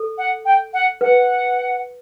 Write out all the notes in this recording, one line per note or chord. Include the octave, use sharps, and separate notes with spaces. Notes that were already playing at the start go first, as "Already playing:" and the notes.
Already playing: A4
F#5
G5
F#5
B4 F#5